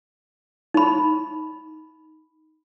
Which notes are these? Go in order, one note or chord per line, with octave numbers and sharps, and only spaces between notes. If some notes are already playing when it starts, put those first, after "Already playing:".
D#4 B5